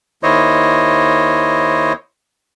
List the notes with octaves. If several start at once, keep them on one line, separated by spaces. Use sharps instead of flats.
D#2 D#3 E4 C5 C#5 D#5